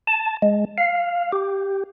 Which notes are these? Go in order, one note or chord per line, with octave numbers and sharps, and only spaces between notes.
A5
G#3
F5
G4